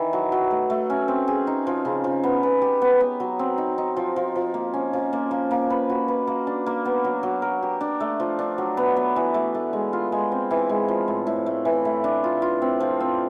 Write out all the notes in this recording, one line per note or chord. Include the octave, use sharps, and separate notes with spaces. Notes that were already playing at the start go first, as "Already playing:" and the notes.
Already playing: D#3 E3
F#3
F#3
A3
A3
C#4
C4
G#4
D#4
F3
C#3
F3
B3
B3
G4
B3
B3
F#3
C4
D#4
D#4
F3
F3
F3
A#3
C#4
F3
A#3
A#3
A#3
B4
F#4
B4
A#3
D4
A#3
B3
F#3
F#3
A#4
G4
D4
A3
F3
D4
F#3
B3
B3
E3
A3
A3
G#3
F4
G#3
C4
E3
G#3
F3
A2
A2
A3
E3
A3
D4
F4
F4
C4
F3
C4